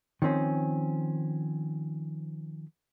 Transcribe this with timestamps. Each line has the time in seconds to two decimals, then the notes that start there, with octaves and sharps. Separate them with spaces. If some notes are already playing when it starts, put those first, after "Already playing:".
0.22 D#3 F3 C4 C#4